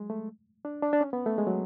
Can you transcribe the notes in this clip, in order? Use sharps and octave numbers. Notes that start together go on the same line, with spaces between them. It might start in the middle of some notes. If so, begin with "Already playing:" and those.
Already playing: F#3 G#3
A3
D4
D4
D4
C#4
B3
A3
G#3
F#3